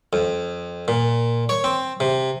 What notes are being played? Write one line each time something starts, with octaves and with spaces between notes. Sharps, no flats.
F2
A#2
C#5
C4
C3